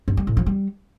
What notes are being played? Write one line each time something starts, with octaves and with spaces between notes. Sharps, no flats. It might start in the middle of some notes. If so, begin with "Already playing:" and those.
G2
G3
A2
F3
G3